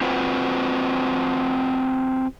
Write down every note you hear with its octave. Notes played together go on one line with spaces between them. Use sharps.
C4 F4 F#4 B4 C5